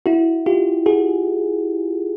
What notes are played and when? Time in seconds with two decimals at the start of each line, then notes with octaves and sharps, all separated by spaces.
0.06 E4 F#4
0.46 F4 G4
0.86 F#4 G#4